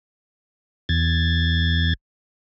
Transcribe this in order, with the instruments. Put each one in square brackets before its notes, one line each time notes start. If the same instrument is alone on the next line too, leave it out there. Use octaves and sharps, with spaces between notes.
[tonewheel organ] E2 G#6 A6